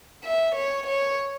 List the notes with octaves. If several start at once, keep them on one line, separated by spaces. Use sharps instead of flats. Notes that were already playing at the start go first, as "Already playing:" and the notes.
E5
C#5
C#5